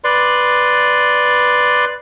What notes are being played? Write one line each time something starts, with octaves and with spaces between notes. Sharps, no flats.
B4 D5 C6